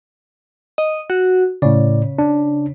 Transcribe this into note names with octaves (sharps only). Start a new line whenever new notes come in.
D#5
F#4
A2 C#3 D5
D4